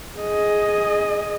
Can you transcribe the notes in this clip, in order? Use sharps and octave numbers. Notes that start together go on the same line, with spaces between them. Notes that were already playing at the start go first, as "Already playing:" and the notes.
G#4 D#5